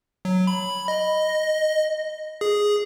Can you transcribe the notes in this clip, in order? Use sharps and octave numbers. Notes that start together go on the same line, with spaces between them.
F#3
B5
D#5
G#4